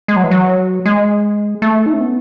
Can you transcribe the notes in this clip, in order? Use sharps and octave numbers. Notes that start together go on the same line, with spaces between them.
G#3
F#3
E3
F#3
G#3
A3
D#4
C#4
B3